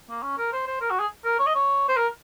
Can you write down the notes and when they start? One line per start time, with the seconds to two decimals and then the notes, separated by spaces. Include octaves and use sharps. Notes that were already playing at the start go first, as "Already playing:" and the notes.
0.09 A#3
0.23 C#4
0.38 A#4
0.53 C5
0.67 C5
0.81 A#4
0.90 F#4
1.00 G#4
1.24 A#4
1.39 C#5
1.46 D#5
1.55 C#5
1.88 C5
1.97 A#4